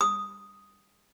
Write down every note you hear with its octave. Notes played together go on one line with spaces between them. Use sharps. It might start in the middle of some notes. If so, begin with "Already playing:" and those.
D#6